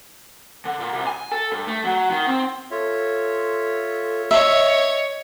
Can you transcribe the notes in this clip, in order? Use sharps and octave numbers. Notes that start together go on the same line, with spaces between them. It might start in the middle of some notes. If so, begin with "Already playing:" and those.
D3
A#2
C2
G#5
A4
G2
A3
F#3
D#3
C4
F4 A4 C#5 E5
C#5 D#5 E5